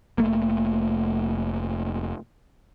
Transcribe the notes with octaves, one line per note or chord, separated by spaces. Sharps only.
F1 A3 A#3